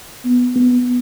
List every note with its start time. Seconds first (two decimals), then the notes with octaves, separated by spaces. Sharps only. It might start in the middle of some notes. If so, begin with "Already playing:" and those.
0.25 B3
0.56 B3